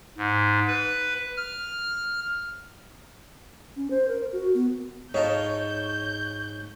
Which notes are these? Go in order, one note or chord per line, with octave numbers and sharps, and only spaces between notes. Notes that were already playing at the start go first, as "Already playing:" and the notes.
G#2
B4
F6
C#4
C5
A#4
F#4
B3
G#2 D#4 F4 A4 C#5 G6